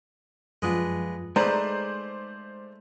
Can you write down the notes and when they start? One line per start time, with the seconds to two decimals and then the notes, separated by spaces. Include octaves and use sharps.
0.62 F#2 F3 G#3 B3 D4 F4
1.36 G#3 A3 D#4 B4 C5 D5 A#5 D6